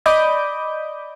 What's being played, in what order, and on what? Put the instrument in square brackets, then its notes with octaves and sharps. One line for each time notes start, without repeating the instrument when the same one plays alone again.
[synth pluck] D5 D#5 B5 D6 D#6 G6